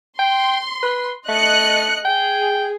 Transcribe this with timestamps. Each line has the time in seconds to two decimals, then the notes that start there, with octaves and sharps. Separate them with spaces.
0.19 G5 C6
0.83 B4
1.29 A3 D#5 F#6 C#7
2.05 G#4 G5